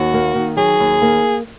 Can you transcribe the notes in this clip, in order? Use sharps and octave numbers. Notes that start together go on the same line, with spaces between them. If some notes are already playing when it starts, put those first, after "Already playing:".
Already playing: D#2 F#4
A#3
D#3
F#3 G#4
D#2
A#3